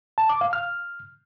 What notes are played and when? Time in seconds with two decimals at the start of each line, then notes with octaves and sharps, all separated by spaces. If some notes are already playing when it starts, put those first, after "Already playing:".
0.18 A5
0.29 D6
0.41 F5
0.53 F6